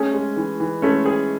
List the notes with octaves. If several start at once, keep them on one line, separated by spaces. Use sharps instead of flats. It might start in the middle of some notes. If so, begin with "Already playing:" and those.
Already playing: A3 C#4 G#4
G#3
E3
E3
G#3 A3 C#4
G#4